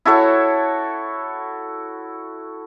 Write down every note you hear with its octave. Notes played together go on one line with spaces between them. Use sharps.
E4 F#4 A4 C#5